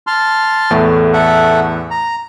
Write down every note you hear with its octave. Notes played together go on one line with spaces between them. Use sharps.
A5 C6 F6
E2 A2 A3
A4 E5 F#5
A#5